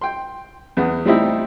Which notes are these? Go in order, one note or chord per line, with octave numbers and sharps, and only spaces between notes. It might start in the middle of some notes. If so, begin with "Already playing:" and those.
G5 C6
E2 B3
A2 G3 C4 D#4 E4 G4